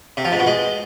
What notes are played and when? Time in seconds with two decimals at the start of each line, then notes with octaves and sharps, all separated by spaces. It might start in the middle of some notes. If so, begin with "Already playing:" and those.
0.17 C3
0.25 F3
0.32 G#2
0.39 B2
0.47 G#3